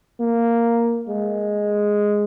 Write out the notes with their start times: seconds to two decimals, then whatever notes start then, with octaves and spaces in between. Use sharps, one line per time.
0.20 A#3
1.08 G#3